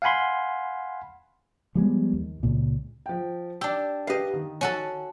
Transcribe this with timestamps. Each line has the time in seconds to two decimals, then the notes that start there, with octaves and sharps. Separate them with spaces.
0.02 F5 F#5 G#5 B5 C6
1.75 F3 G3 G#3 B3
2.13 D#2
2.43 C#2 A#2
3.06 F3 G5
3.61 D4 G4 E6
4.07 G4 B4 D#5 F5
4.34 D#3
4.61 C#4 F#4 A4